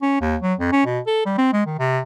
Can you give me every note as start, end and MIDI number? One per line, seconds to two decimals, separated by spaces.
0.02 0.21 61
0.21 0.36 39
0.42 0.54 54
0.60 0.72 41
0.72 0.83 61
0.86 1.00 47
1.07 1.22 69
1.26 1.37 55
1.38 1.50 60
1.53 1.64 56
1.67 1.76 51
1.79 2.01 48